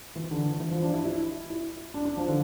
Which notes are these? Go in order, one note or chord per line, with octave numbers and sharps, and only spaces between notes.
E3
D3
E3
E3
F3
D4
E4
E4
E4
D4
D4
F3
D3